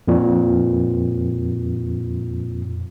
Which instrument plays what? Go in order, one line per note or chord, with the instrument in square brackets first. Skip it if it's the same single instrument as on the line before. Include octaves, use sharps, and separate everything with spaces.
[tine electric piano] F2 A#2